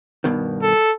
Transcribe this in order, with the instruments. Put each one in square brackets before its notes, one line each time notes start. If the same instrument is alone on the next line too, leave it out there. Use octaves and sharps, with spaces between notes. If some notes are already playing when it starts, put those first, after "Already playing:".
[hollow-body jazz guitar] G2 B2 D#3
[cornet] A4